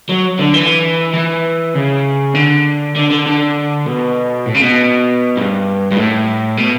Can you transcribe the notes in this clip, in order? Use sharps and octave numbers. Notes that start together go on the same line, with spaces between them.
F#3
D3
E3
E3
C#3
D3
D3
D3
D3
B2
A2
C#3
B2
G2
G2
A2
B2